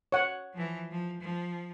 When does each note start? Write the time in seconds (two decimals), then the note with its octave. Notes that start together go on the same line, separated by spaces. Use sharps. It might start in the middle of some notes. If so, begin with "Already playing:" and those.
0.12 C#5 F#5
0.54 E3 F3
0.91 F3
1.21 F3